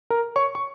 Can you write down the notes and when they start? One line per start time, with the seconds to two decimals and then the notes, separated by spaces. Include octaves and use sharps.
0.10 A#4 A#5
0.36 C#5 C#6
0.55 C#6